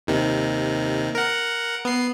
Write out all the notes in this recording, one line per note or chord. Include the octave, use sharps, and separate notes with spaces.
D#2 C3 D#3
A#4 F#5
B3 C7